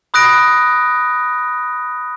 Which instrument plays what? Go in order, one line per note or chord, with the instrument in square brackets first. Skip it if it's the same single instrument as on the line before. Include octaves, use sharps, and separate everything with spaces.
[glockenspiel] B5 D#6 F#6 A#6 D7